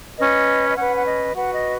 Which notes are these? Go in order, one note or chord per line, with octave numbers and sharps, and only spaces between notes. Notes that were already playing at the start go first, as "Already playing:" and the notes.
C#4 B4 D#5
D#5
C#4 B4 F#5
F#5
D#5
F#4 B4 F#5
D#5